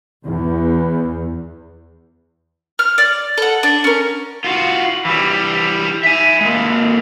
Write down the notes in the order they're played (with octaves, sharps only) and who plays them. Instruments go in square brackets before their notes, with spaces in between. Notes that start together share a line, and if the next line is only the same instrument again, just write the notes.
[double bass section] E2
[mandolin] F6
D5
A4 F#5
D4
C#4 A#4
[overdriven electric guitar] F4 F#4
E3 G3
E5 G#5
G#3 A#3